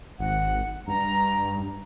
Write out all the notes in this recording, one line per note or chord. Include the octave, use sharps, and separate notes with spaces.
G#1 F#5
G2 A#5